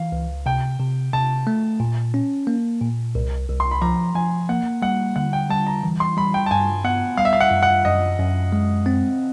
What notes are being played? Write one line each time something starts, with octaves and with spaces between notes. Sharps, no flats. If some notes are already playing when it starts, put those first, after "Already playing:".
Already playing: E3 F5
C#2
C3 G5
C3
C3 A5
A3
A#2
C#4
A#3
A#2
C2
C2
C6
B5
F3 A#5
F3 G#5
A#3 F#5
G3 F#5
D3 F#5
G5
G3 A5
A#5
E3
C6
G3 B5
G5
A5
G2 G#5
B3 F#5
G3 F5
E5
F5
F#5
F#2
F#5
F#2 D#5
F#2
G#3
C4